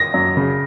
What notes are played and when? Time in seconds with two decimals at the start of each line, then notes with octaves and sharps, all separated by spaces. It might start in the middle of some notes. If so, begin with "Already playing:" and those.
Already playing: A#6
0.14 F#2
0.37 C#3